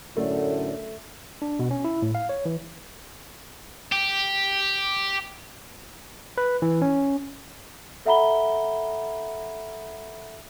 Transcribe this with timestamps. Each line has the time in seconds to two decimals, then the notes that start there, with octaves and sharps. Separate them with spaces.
0.17 F#2 A2 D3 A3
1.42 D4
1.59 B2
1.71 C#4
1.84 E4
2.02 A2
2.15 F5
2.29 C#5
2.45 E3
3.92 G4
6.38 B4
6.62 E3
6.82 C#4
8.05 A4 E5 F#5 A#5 B5 G7